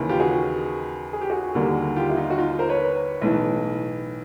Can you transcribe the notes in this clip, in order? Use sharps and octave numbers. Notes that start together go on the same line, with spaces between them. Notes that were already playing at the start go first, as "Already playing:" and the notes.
Already playing: D#2 C#3 E3
F4 G4
F#4 G#4
G#4
G4
F#4 G#4
D#2 D3 G3 A#3
F4 G4
E4
D#4 F4
F#4
D#4 F4
A#4 C5
B4 C#5
B1 A2 E3